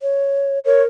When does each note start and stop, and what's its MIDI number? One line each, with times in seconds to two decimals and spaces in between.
0.02 0.59 73
0.66 0.88 70
0.66 0.82 73